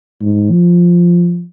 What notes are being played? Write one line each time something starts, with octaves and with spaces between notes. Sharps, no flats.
G#2
F3